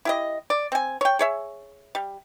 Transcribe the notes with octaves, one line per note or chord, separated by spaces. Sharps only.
E4 G4 D#5
D5
C4 G#5
C#5 G5
G#4 C#5 E5
G3